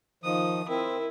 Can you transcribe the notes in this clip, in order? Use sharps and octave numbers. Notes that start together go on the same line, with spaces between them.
D#3 F3 D#6
C4 E4 A#4